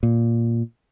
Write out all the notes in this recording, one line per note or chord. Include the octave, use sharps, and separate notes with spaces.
A#2